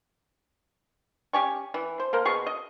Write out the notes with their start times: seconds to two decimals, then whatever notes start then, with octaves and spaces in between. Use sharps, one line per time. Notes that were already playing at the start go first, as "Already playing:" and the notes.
1.33 C#4 G4 G#5 C#6
1.74 E3
2.00 C5
2.13 A#3 A#4 C5
2.25 B2 G#4 C#6
2.47 D#5